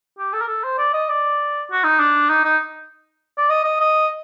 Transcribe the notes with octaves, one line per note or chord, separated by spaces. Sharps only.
G4
A4
A#4
A4
C5
D5
D#5
D5
F#4
D#4
D4
D#4
D#4
D5
D#5
D#5
D#5